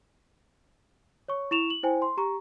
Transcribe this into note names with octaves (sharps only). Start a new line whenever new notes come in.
C#5 C#6
E4 C#6 E7 F7
F#7
E4 C5 G5 G#5
C6
G4 A#5 C#6